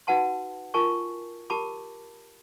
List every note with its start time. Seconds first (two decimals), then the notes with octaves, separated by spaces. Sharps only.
0.07 D#4 F#4 B4 F#5 A5 C6
0.74 F4 A#4 G#5 A5 C#6
1.50 G4 A#4 A5 B5 D6